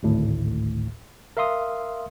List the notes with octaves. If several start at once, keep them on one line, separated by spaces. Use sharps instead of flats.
G#1 D2 A2
A#4 E5 F5 C6 D#6